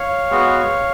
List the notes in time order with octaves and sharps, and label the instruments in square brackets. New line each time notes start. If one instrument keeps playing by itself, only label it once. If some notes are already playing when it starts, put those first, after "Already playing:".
Already playing: [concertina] C#5 F5
G#3 B3 F#4